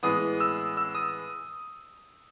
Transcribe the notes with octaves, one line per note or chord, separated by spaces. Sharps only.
A2 E3 G#3 B3 D#6
E6
E6
D#6